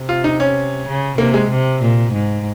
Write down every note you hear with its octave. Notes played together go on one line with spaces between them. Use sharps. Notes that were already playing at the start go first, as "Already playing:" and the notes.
Already playing: C3
F4
D#4
C#4
C#3
C3 A#3
G#3
C3
A#2
G#2